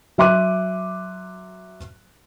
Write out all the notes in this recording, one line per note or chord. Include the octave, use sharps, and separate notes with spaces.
F#3 E5 C6 D6 F#6 D#7